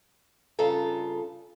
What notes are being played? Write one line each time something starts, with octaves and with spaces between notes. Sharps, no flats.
G2 C#3 F4 A4 A#5